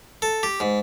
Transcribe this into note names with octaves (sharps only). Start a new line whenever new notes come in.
A4
G4
G#2